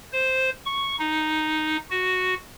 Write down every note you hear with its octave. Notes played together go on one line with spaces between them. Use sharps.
C5
C#6
D#4
F#4